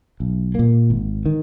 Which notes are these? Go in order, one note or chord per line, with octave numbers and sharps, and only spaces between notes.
B1
A#2 A#3
G#1
D#3